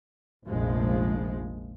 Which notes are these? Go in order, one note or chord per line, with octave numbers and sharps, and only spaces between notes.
F1 A#1 A#2 F3 G#3